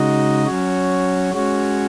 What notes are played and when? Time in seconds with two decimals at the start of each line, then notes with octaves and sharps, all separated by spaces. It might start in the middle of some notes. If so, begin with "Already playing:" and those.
Already playing: C#3 G#3 D#4 F#4 D#5
0.46 F#3 C#4 F#4 C#5
1.33 G#3 C#4 F#4 C#5